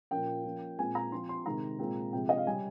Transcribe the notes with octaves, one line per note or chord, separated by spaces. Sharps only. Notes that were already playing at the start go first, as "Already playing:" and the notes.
A#2 F3 A#3 C#4 G5
F3 A#3 C#4
A#2 G#3 C4 G#5
A#5
F3 C4 C6
C6
C3 D#3 G#3 A#5
A#2 G#3 C4
C3 F3 G#3 G5
D#5
F5
C#3 G3 C#4 G#5